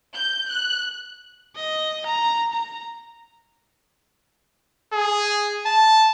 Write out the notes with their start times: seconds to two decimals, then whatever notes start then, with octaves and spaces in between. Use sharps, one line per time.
0.16 G6
0.50 F#6
1.55 D#5
2.06 A#5
2.52 A#5
4.93 G#4
5.66 A5